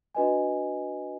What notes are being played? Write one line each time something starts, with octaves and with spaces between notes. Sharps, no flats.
D4 F#4 B4 D#5 G#5